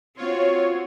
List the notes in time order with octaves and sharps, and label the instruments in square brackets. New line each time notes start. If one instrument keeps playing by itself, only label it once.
[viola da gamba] C4 F#4 [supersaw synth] F4 C#5